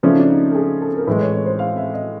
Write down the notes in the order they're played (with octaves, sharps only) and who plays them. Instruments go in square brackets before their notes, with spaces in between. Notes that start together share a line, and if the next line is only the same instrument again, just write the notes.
[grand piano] C#3 F3 A3 C#4 E4 [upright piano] D4
[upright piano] D#4
D4
D#4
A4
G#4
A4
A#4
[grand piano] A2 E3 G#3 [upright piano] B4
[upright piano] C#5
C#5
C5
F5
E5
D#5